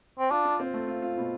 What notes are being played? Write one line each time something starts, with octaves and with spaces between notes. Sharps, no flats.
C4
D4 F4
F4
C4
A3
F4
F4
B2